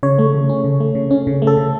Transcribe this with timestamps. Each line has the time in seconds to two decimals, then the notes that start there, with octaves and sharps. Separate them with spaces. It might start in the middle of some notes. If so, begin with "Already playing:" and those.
0.03 C#3 C#5
0.18 A3
0.34 C#3
0.49 C#4
0.64 C#3
0.80 A3
0.95 C#3
1.11 C#4
1.27 C#3
1.42 A3
1.47 A4
1.57 C#3